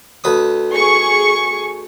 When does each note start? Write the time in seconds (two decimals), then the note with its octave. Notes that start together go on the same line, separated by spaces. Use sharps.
0.24 D2 B4 D#6
0.73 G#4 C#6